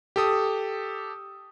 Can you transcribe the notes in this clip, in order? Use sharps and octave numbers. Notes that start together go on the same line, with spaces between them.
G4 A4 D#6